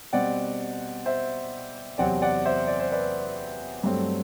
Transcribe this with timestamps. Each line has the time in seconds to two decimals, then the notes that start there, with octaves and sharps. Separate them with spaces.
0.13 B2 G3 C4 D5 F#5
1.06 C5 E5
1.98 E2 C3 F#3 C4 D5 F#5
2.22 D5 F#5
2.45 C5 E5
2.68 D5
2.80 C5
2.92 B4 D5
3.84 G2 F#3 A3 C4